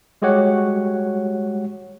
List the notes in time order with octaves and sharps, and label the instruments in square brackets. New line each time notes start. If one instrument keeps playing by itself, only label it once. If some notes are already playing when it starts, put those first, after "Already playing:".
[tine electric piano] G3 G#3 F#4 G4 C#5 F#5